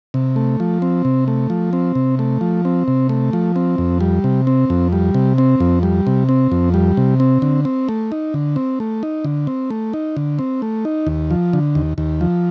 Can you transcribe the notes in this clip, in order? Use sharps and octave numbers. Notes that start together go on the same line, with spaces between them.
C3
A3
F3
C4
C3
A3
F3
C4
C3
A3
F3
C4
C3
A3
F3
C4
F2
G3
C3
C4
F2
G3
C3
C4
F2
G3
C3
C4
F2
G3
C3
C4
D3
C4
A3
D#4
D3
C4
A3
D#4
D3
C4
A3
D#4
D3
C4
A3
D#4
D#2
F3
D3
D#2
D#2
F3